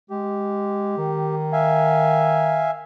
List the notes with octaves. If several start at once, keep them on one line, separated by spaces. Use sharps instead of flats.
G#3 G4
D#3
E5 F5 G#5